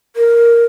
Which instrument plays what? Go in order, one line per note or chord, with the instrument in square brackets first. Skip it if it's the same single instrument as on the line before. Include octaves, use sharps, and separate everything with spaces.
[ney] A#4